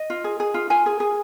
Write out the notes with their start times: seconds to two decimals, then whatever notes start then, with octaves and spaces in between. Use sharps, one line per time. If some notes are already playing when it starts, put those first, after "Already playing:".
Already playing: D#5
0.10 F4
0.24 G#4
0.40 G#4
0.54 F4
0.70 F4 G#5
0.86 G#4
1.00 G#4